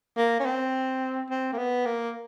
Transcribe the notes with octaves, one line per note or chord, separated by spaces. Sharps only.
A#3
C#4
C4
C4
A#3
B3
A#3